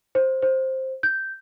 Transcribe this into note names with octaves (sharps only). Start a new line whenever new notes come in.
C5
C5
G6